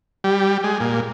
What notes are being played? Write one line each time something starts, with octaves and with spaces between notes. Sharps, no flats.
G3
G#3
A#2